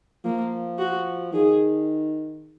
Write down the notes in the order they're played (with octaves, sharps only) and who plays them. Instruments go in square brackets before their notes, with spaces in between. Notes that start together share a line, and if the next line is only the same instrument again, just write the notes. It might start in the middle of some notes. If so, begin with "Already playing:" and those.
[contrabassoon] F3 [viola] A#3
[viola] F#4
[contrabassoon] D#3 [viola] G#4